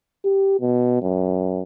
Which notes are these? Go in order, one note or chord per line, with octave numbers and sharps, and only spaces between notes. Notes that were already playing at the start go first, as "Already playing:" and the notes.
G4
B2
F#2